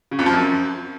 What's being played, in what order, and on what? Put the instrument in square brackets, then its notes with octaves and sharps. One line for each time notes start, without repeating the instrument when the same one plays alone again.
[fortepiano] C#3
F2
F3
F#2